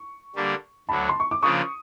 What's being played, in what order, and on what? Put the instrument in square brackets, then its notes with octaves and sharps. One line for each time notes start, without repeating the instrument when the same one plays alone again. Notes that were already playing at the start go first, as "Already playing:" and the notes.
Already playing: [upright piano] C#6
[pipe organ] D3 G3 A#3 D4
[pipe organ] D2 D3 F#3 [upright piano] A5 B5
[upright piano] C6
C#6
D6
[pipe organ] C#3 F3 A#3 D4 [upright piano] C#6 D#6